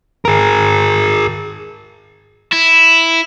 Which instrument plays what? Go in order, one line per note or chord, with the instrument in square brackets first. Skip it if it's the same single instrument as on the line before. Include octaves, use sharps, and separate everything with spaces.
[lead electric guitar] G#4 A#4
[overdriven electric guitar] E4